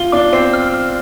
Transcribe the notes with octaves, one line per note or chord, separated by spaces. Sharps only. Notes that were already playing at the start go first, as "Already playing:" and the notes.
Already playing: F4 G7
D4 D6
C4 C7
F6
F6